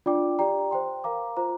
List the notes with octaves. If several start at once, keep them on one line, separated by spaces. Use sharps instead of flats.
D4 F4 D5 G5 D6
G4 D5 G5 A#5
C5 G5 C6
A#4 F5 A#5 D6
F4 C5 A#5 D6